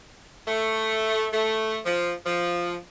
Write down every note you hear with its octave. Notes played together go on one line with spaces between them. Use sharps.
A3
A3
F3
F3